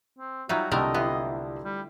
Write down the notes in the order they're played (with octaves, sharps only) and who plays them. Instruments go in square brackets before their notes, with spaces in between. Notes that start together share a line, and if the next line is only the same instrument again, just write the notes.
[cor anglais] C4
[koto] F#3 G3 D#4 [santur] F4 [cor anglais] F#4 [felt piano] E5
[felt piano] C2 G5 A5 [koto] D3 A3 A#4 [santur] E4 [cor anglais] D#5
[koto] B3 [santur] E4 G4 C6
[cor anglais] G3